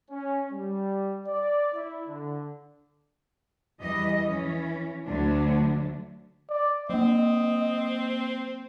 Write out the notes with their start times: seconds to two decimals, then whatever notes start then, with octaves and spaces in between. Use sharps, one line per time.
0.10 C#4
0.53 G3
1.27 D5
1.74 E4
2.08 D3
3.80 E2 E3 G3 D#5
4.29 E3 C#4
5.06 D2 D3 F#3 A3 D4
6.50 D5
6.90 F#3 A#3 C4 D#5